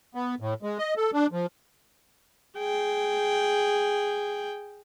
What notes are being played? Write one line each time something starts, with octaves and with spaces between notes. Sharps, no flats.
B3
A2
G#3
D#5
A4
D4
F3
G#4 G5